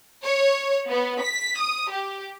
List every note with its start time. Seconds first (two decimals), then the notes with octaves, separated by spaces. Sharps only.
0.25 C#5
0.90 B3
1.22 B6
1.59 D#6
1.92 G4